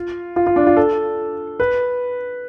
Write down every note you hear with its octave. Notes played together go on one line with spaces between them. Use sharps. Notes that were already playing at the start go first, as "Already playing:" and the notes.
Already playing: F4
F4
F4
D4
F4
A4
B4